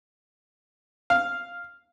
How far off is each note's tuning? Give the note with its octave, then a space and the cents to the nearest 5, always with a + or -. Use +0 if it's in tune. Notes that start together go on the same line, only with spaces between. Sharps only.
F5 +0